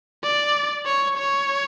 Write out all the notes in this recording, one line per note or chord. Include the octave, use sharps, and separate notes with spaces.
D5
C#5
C#5